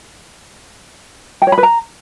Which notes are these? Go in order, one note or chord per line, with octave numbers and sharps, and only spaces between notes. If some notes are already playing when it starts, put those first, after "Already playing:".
G5
C#5
B5
B4
A#5